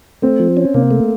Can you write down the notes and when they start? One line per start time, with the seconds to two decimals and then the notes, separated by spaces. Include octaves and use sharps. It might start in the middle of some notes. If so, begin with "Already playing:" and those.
0.22 A3 C4
0.39 F3
0.57 C#4
0.74 C3 A#3
0.91 A3